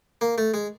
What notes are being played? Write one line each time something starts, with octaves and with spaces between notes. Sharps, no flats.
A#3
A3
G#3